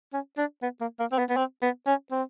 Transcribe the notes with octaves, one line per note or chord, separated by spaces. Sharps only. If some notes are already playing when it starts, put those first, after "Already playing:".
C#4
D4
B3
A#3
A#3
C4
B3
B3
C4
B3
C#4
C4